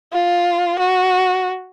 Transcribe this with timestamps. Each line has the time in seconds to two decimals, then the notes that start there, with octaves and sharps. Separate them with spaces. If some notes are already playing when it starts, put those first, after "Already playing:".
0.12 F4
0.78 F#4